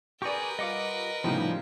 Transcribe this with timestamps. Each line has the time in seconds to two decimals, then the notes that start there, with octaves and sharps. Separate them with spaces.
0.22 G4 G#4 A#4 B4 D5 A#5 C#6 G6
0.59 G3 F4 D#5 F#5 D6
1.24 A2 C#3 F3 G3 B3 D#4 G4